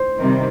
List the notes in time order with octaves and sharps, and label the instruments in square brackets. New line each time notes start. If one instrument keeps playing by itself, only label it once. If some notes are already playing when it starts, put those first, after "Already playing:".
Already playing: [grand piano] C5
[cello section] C3 D#3 G3 C4